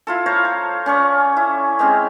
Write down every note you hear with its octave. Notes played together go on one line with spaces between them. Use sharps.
E4 F4 A4
C5 C#5 F5 A#5
A4
C#4 D5 C#6
E4
G#3 C4 C#4 G4